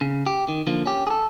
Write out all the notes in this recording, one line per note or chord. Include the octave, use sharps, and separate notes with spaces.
C#3
G4
D#3
D3 F3 A#3
C#4 G4
G#4 A4